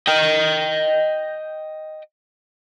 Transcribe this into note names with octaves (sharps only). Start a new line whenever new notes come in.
D#5 G5